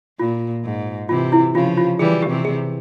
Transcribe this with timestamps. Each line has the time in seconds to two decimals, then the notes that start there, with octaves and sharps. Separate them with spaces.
0.19 A#2 F4
0.64 G#2
1.09 C3 E3 F4
1.32 E4
1.55 C#3 F3 F4
1.77 F4
1.99 E3 G3 G#4
2.22 G4
2.30 C3 E3
2.45 G#4